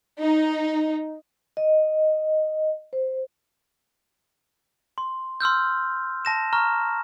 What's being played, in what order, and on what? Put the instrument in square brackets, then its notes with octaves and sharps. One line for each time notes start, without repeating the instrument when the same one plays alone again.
[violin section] D#4
[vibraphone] D#5
C5
[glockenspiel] C6
C6 E6 F6 G6
A5 A#6 E7
A#5 C#6 F6